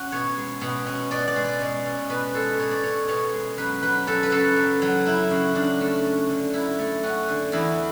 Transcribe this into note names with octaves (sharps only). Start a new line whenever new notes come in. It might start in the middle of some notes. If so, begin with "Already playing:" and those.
Already playing: C#4 F#4
B2 C#5
G#3
B2
C#4
B2 D5
D5
G#3
D5
B2
C#4
B2 B4
G#3 A4
B2 C#5
D5
C#4 C#5
B2 C#5
G#3
F#2 B4
F#3 B4
F#2 A4
B4
C#3 A4
F#2
F#3
F#2 E4
C#3 F#4
F#2 D4
A3
C#4
D3
F#2 E4
A3
C#4 F#4
D3
E2 E4